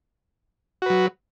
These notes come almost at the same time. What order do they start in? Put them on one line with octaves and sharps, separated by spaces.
F#4 B4 F#3